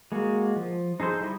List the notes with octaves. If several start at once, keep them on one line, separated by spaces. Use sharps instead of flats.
G#3 A#3 F#4
F3
D#4 G#4 A4 C5
G3 E4 D#5